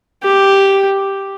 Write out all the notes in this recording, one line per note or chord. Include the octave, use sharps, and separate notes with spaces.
G4